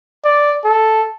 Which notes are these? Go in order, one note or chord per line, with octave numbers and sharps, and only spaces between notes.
D5
A4